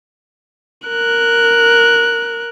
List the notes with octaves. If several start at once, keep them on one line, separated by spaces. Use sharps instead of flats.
A#4 F#6